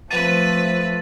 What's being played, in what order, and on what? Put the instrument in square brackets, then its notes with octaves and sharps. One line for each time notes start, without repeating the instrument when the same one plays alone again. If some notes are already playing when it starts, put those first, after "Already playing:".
[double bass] F3 A3 [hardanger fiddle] C4 B4 [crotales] A6 D#7